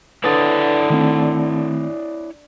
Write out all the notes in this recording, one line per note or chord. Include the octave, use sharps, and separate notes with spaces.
D3 E4 B4 C#5 D5 D#6 A6
D#3 A3 C4